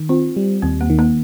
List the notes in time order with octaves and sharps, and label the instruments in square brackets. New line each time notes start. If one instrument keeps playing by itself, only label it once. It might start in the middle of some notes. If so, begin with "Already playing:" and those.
Already playing: [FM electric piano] D#3
[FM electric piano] C4 [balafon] F4
[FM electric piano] G3
[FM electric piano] D#2 [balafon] C4
[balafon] A#3
[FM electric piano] D#3
[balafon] A#3